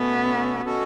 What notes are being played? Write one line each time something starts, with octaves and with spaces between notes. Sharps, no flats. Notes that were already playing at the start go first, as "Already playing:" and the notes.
Already playing: B2 A3 B3 C#4 F#4 A4
B2 A3 C#4 F#4 A4